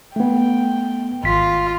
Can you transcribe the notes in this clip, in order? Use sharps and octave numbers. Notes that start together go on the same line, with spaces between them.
A3 B3 G5
G#1 F4 B6